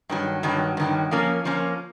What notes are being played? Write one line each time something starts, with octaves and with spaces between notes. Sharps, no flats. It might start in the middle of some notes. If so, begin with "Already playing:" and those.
G2 D#3 F#3
G2 D#3 F#3
G2 D#3 F#3
F3 A#3 C#4
F3 A#3 C#4